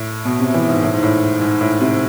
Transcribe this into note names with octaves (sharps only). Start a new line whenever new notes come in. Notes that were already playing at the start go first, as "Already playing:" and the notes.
Already playing: A2
B2
C3
E3
G#2
A2
G#2
A2
G#2
A2
C3